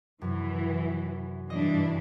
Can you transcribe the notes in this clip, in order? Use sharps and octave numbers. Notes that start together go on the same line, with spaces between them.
F#2 C3 E3
G2 E3 D4 D#5